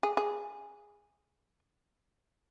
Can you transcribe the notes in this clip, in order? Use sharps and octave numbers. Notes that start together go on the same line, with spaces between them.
G#4
G#4